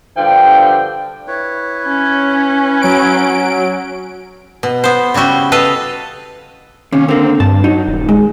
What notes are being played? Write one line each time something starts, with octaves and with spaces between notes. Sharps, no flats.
G2 D3 F3 G5
E4 B4 C#5
C#4
F#3 D7
B2
B3 C5
C#3 G3 E4 F#4 G5
A4 B4 D#5 F5
D#2 C3 C#4
D3 A#3 C4
G2 A5
F#3 D#4
D#1
G#3